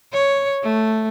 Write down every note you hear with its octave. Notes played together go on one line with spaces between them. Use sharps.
C#5
A3